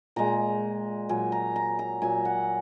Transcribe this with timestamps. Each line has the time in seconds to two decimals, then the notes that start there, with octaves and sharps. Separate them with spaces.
0.16 A#2 G#3 A#5
1.09 A#2 F#3 G#5
1.32 A#5
1.56 A#5
1.79 A#5
2.02 A#2 F#3 G#5
2.25 F#5